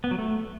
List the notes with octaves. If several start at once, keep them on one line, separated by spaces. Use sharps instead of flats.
B3
F#3
A3